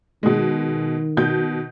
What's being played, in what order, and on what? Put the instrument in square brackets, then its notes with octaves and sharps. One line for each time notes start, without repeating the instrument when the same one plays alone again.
[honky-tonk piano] B2 G#3 [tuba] D#3
[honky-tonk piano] B2 G6